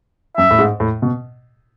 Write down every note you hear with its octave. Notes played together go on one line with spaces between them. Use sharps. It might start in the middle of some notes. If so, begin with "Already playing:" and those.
F#2 E5
A2
G#2
A2
B2